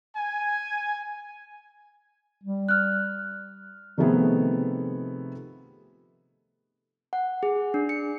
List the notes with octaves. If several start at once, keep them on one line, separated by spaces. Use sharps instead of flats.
G#5
G3
F6 F#6
C3 D#3 F3 A3 B3 G#4
F#5
G#4
D4
C#7